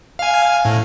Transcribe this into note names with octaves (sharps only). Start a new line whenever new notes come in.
F5 G#5
A2